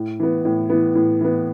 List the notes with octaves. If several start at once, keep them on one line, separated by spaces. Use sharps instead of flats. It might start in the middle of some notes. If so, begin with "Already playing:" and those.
Already playing: A2
E3 B3
A2
E3 B3
A2
E3 B3